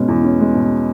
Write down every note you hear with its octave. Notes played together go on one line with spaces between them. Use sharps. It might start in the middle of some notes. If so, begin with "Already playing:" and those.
Already playing: B2 G#3 C#4
E2
C#4
G#3
B2